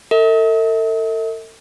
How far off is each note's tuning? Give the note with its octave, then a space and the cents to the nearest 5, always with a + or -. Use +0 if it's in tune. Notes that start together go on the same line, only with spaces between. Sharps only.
A4 +40 E5 -45